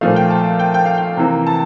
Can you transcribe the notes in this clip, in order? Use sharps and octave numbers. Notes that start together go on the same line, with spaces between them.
A#2 F3 A3 F5
G5
A5
G5
G5
F5
G5
C3 E3 A#3
A5